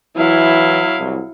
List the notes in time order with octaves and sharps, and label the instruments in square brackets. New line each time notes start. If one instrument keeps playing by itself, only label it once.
[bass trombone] E3 [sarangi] F#3 [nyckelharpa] E4 F5
[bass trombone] C2